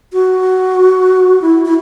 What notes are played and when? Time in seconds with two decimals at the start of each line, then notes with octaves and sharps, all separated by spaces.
0.13 F#4
1.42 E4
1.65 E4